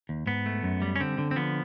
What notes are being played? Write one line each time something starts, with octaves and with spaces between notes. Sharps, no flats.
D#2
G#2 B3
A3
F#2
G3
C#4
D3 C4
D3
C4
F3 B3